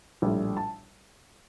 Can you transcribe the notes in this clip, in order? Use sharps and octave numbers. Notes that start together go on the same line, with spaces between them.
A#1 A2 G3
A5